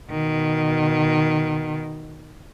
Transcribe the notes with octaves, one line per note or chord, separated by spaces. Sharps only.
B2 D#3